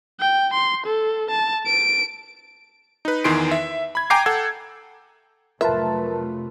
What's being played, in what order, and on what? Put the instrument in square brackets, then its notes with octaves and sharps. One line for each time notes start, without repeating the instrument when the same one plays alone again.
[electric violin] G5
C6
A4
A5
D7
[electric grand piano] D#4 B4
E2 D#3 E3 C6 C7 D7
E5
B5 G#6
G5 G#5 A#5 D6 G6 C7
A4 F#5 E6 G#6
[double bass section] F1 F#3 A3 [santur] F4 B4 [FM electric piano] A#4 A5 [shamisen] E5